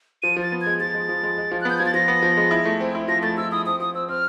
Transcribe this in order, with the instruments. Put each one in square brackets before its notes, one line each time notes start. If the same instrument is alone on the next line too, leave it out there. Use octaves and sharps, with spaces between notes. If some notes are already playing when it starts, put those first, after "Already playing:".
[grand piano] F3 [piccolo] D#7
[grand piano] F3 [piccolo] A6
[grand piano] B3
[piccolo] G#6
[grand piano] G#3
[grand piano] F3 [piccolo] A6
[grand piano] G#3
F3
G#3
G#3
F3
[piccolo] F#6
[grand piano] B3 [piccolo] G6
[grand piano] F3 [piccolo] G#6
[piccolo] A6
[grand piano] F3 [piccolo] A#6
[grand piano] B3
F3
G#3
E4
A3
C4
E4
[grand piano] F3 [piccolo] A#6
[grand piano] A3 [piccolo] A6
[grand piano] F3 [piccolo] E6
[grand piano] E4 [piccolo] D#6
[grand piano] C4 [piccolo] D#6
[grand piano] F3 [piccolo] D#6
[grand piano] C4 [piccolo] E6
[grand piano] C4 [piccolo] F6